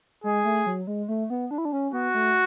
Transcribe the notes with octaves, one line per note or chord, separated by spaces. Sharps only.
G#3 G#4
A3
F#3
G#3
A3
B3
D4
E4
D4
C#4
B3 F#4
A3